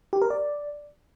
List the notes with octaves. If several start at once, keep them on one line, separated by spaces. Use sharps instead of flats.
G4
A#4
D5